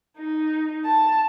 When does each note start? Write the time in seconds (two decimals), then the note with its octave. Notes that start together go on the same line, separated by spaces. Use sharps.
0.18 D#4
0.85 A5